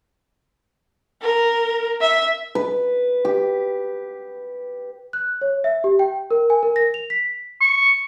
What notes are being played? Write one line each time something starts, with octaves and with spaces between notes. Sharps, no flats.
A#4
E5
B4
G4
F#6
C#5
E5
G4
G5
A#4
G#5
A#4
A#6
F7
B6
C#6